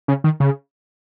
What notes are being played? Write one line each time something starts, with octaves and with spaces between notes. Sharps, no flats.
C#3
D#3
C#3